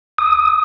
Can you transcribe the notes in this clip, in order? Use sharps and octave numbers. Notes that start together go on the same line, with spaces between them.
D#6